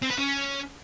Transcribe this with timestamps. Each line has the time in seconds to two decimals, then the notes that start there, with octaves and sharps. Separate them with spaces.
0.03 C4
0.11 B4
0.18 C#4